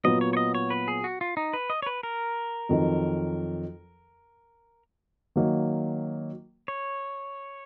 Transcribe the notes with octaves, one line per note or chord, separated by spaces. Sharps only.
A#2 F#3 B3 D#5
C#5
C#5
D#5
C#5
B4
G#4
F#4
F4
D#4
B4
D#5
C#5
B4
A#4
F2 D#3 F#3
D#3 F#3 A#3
C#5